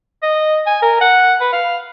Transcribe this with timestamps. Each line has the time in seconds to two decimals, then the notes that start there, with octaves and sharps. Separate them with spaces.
0.23 D#5
0.66 G#5
0.82 A#4
1.01 F#5
1.41 B4
1.53 F5